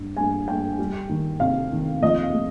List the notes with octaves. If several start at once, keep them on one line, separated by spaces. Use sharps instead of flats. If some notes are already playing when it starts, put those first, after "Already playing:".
Already playing: G2 G3
G2 G#5
G2 G5
G3
D#3
C3 F5
D#3
F3 D#5
F5
G#3